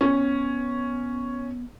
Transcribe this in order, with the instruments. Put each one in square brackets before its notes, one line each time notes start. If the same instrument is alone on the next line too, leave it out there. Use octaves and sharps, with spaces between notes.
[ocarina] B3 [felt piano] C#4